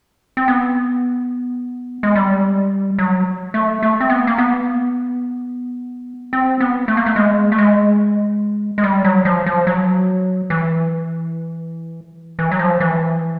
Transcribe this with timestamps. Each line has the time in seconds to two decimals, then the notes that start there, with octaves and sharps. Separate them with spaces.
0.37 C4
0.48 B3
2.03 G#3
2.16 G3
2.99 F#3
3.54 A3
3.83 A3
4.01 C4
4.10 B3
4.27 A#3
4.38 B3
6.33 C4
6.60 B3
6.88 A3
6.97 A#3
7.06 A3
7.16 G#3
7.52 A3
7.58 G#3
8.78 G#3
8.84 G3
9.05 F#3
9.25 F3
9.46 F3
9.67 F#3
10.50 E3
12.39 E3
12.51 F#3
12.59 F3
12.80 E3